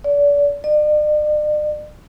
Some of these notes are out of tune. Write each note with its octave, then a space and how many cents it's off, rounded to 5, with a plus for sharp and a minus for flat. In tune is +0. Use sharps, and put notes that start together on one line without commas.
D5 -35
D5 +45